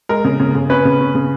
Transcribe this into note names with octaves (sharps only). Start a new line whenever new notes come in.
G#3 A#4
C#3
C#3
C#3
C#4 B4
C#3
C#4
C#3